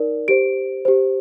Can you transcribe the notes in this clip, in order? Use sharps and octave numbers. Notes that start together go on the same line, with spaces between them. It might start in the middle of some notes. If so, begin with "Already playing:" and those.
Already playing: D#4 A#4 D5
G4 C5 D7
G4 C5